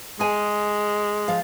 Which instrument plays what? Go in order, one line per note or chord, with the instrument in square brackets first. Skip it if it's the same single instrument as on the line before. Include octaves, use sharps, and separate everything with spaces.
[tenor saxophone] G#3 [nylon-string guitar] G#4 G#5
[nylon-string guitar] F3 F5